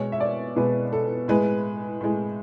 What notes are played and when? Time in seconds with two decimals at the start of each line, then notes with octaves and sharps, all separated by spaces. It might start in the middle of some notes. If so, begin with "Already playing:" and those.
Already playing: B2 G#3 C#5
0.12 E5
0.20 D5
0.56 B2 G#3 B4
0.93 A4
1.28 A2 G#3 B4
2.01 A2 G#3